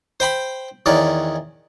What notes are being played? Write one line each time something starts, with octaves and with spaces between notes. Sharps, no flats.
C5 G5 B5 C6
E2 D#3 C#4 D5